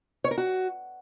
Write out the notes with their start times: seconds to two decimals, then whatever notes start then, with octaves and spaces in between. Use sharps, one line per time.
0.24 C#5
0.31 A#4
0.37 F#4